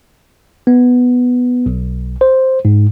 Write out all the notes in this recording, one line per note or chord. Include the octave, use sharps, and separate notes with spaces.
B3
B1
C5
G#2